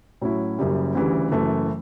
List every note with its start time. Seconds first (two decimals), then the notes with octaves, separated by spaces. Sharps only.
0.21 A2 F#3 C#4 E4
0.59 F#1 F#2 C#3 G3
0.95 D2 C#3 E3 G3
1.31 F#1 F#2 E3 A3